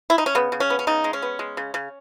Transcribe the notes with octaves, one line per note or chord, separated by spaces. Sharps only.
E4
D#4
C#4
C#3 B3
C#3
C#4
B3
C#4
C#3 D#4
G#3
C#4
B3
G#3
C#3
C#3